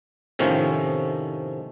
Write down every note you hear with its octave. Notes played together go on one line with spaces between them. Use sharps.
A2 C3 D#3 F3 C#4